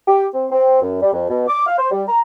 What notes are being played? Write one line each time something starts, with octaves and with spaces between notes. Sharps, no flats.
G4
C4
C4
F#2
G3
F2
B2
D6
F5
C5
G3
A#5